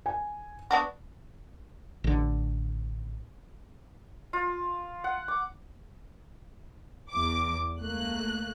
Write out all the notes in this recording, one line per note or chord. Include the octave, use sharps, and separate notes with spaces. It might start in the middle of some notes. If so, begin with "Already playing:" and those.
G#5
B3 D4 F#4
A1 D3
F4
F#5
D6
E2 D6
C#2 A3 A#3 F#6